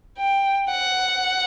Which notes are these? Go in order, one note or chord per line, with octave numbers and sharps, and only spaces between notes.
G5
F#5